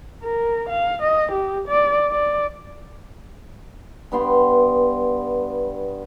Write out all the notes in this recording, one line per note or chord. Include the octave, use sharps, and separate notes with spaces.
A#4
F5
D#5
G4
D5
D5
G2 B3 G5 C6